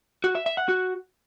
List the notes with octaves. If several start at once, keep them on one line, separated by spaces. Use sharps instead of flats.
F#4
E5
E5
F#5
F#4